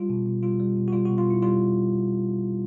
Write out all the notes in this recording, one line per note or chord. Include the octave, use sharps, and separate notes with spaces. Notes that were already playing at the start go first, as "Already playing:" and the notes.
Already playing: G3 F4
B2
B2
G3 F4
G3
B2
F#4
G3 F4
B2 F#4
F4
B2 E4
G3 F4